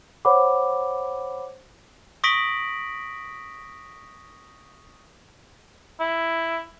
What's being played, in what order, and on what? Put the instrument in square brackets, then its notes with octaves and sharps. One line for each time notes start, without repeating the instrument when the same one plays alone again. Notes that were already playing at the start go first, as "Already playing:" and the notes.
[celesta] C5 C#5 F#5 B5 D6
[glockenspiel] C#6 D#6 A#6 B6 D7 F#7
[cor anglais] E4